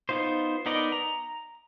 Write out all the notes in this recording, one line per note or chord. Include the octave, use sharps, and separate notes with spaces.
B3 D#4 F4 C5
B3 D#4 A#4 D5 D#5
A#5